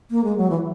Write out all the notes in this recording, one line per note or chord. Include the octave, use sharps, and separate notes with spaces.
A#3
G#3
F#3
E3